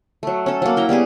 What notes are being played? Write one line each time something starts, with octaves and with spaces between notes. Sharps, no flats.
F#3 A3
C#4 A4
F#3 A#3
E4 G5 A#5
G3 B3 G4 G#4